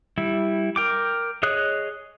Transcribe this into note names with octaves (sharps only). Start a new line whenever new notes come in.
G3 E4
A#4 G5 D6
G#4 C#5 D#5 D#6 F#6